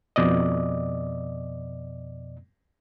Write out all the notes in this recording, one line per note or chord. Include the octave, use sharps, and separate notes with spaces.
F2 B2 D5 D#5